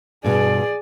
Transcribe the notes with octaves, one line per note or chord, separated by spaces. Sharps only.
G2 B2 G#4 D5